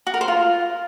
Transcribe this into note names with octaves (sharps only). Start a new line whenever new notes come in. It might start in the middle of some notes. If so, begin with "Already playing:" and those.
F#4
A#4
C5
F4